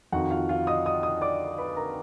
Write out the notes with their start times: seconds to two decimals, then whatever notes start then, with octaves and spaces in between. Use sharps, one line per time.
0.12 F2 D#3 F#4 F#5
0.31 F4 F5
0.49 F4 F5
0.67 D#5 D#6
0.86 D#5 D#6
1.03 D#5 D#6
1.21 D5 D6
1.58 B4 B5
1.76 A#4 A#5